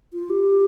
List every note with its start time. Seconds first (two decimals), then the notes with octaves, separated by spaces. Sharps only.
0.13 F4
0.30 G4